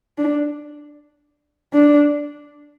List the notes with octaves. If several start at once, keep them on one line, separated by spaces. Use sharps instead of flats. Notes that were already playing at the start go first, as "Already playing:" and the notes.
D4
D4